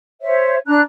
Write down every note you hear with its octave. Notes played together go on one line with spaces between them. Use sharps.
C5 C#5 E5
D4 A#5 F#6